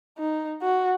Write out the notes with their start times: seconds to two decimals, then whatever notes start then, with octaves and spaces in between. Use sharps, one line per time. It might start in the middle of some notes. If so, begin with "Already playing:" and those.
0.18 D#4
0.62 F#4